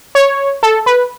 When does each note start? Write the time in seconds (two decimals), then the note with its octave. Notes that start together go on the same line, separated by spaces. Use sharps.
0.15 C#5
0.63 A4
0.86 B4